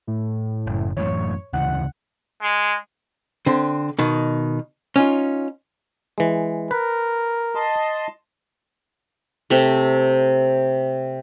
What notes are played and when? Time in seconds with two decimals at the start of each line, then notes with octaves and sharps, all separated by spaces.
0.07 A2
0.67 F#1
0.97 F#2 A2 E3 C#5
1.53 D2 C#3 E3 F#5
2.42 G#3
3.46 D3 C4
3.99 B2 D#3
4.96 C#4 D#4 F4
6.18 E3 G#3
6.71 A#4 B4
7.55 D#5 A5 C6
9.50 C3 A3